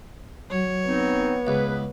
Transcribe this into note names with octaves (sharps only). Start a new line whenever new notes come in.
F#3 C#5
B3 C4 D#4
C#2 G#4 B4